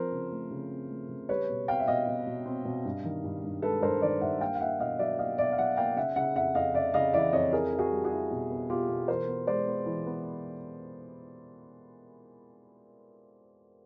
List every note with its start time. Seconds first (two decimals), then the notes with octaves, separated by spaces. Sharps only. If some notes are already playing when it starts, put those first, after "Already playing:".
Already playing: F3 C4 A#4 C5
0.12 C#3
0.32 A3
0.51 C#3
0.71 C4
0.90 A3
1.09 C#3
1.29 G3 B4 C#5
1.49 B2
1.68 C4 F5 G5
1.79 E5
1.88 B2 D#5 F5
2.07 B2
2.27 B2
2.46 C4
2.65 B2
2.85 G2
3.04 D#3
3.24 G2
3.43 G2
3.62 G#3 A4 B4
3.82 G2 A#4 C5
4.02 D#3 C5 D5
4.21 G2 E5 F#5
4.41 A#3 F5 G5
4.55 F5
4.61 A#3 E5 F#5
4.79 B2 D#5 F5
4.99 F#3 D5 E5
5.19 A#3 D#5 F5
5.38 B2 D5 E5
5.52 F5
5.58 F#3 E5 F#5
5.77 A#3 F5 G5
5.96 C#3 E5 F#5
6.16 C#3 E5 F#5
6.36 F2 E5 F#5
6.55 F2 D#5 F5
6.74 C#3 D5 E5
6.94 C#3 D#5 F5
7.13 E3 D5 E5
7.33 F2 C#5 D#5
7.52 E4 G#4 A#4
7.73 E4
7.79 F#4 G#4
7.91 G3
8.05 F#4 G#4
8.11 E4
8.31 B2
8.50 B3
8.70 B2 F4 G4
8.89 B2
9.08 E3 A#4 C5
9.28 B3
9.47 G#3 C5 D5
9.67 B3
9.86 E3
10.06 B3